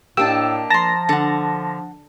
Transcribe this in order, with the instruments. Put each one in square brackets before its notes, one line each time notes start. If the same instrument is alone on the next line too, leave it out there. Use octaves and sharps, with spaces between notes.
[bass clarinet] A2 [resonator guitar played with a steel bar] A#3 D4 [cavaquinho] G4 D#5 A5 [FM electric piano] E6
[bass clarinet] F3 [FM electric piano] A5 A#6 [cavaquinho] A#5 C6
[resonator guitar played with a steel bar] D3 [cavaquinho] A4 F#5